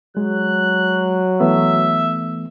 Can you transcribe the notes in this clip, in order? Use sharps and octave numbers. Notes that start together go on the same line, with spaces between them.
F#3 G#3 F#6
E3 A3 B3 E5